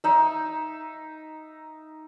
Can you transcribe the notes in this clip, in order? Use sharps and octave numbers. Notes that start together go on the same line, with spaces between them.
D#4 E5